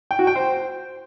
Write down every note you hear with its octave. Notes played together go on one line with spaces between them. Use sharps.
G5
F#4
G5
C5